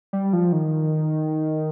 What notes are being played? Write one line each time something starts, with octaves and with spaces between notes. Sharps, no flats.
G3
F3
D#3